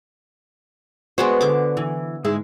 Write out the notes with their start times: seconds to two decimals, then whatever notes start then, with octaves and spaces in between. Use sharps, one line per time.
1.18 G#3 B3 D4 F#4 B4 C5
1.41 D3 D6
1.77 E3
2.25 G#2 G#3 E4